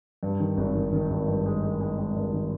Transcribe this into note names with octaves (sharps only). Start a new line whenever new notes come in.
G2
D#3
G#1
D#3
D#3
G#1
G2
G#3
G#3
G#3
G#3
G2
D#3